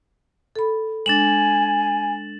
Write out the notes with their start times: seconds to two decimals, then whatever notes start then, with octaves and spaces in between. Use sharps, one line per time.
0.56 A4 B5
1.06 G#3 D4 G#5 A6 E7 F#7